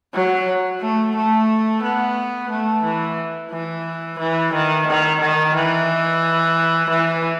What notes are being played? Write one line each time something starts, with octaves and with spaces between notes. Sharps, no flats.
F#3
A3
A3
B3
A3
E3
E3
E3
D#3
D#3
D#3
E3
E3